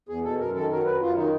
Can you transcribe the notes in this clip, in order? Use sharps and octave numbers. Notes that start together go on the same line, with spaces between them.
E2 G#4
B2 A4
F#2 A#4
D#3 A4
F#3 A#4
F#2 B4
F#2 F4
D#3 D#4